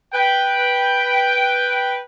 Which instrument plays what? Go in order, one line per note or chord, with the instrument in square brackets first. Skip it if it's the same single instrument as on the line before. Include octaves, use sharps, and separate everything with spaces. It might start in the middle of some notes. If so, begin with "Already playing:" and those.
[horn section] B4 G5